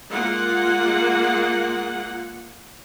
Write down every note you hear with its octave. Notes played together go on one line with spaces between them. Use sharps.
G#3 A#3 F4 F#5